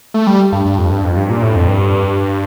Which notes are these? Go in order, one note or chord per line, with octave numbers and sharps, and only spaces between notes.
A3
G3
G2
G2
F2
G2
F2
G2
A#2
A2
F2
G2